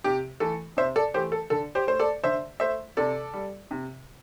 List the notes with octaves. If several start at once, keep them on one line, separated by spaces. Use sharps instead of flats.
C3 G4
E3 A3 A4
C3 C5 E5
A4 D5
E3 A3 G4 C5
A4
D3 A4
G4 C5
A3 C5
A4 D5
D3 C5 E5
A3 C5 E5
C3 A4 D5
G3
C3